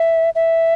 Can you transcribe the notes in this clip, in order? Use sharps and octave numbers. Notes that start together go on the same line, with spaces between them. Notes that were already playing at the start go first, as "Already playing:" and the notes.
Already playing: E5
E5